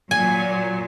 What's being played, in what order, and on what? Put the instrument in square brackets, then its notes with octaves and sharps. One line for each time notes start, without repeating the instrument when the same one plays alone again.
[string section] A#2 F#3 [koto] G#5